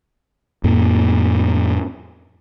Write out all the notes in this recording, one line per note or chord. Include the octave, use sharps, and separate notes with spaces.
F2 A2 A#3